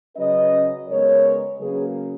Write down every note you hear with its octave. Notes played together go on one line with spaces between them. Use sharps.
C#3 F#3 C#4 B4 D#5
C#3 G#3 B3 A#4 C#5
C#3 F#3 A#3 C#4 G#4 B4